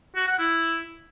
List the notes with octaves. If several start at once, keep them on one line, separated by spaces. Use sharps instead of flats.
F#4
F#5
E4